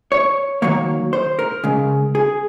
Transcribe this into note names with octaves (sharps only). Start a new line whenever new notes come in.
C#5
D#3 F#3 A#3 C#5
C5
A#4
C#3 G#3
G#4